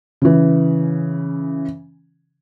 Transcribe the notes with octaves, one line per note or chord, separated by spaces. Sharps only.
C#3 E3